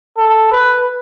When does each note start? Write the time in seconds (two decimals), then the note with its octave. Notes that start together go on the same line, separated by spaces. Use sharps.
0.17 A4
0.51 B4